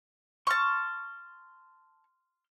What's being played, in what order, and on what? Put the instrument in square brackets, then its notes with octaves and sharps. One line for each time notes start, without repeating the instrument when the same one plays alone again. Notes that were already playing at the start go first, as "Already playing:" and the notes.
[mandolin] A5 C#6 [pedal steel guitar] C6 F6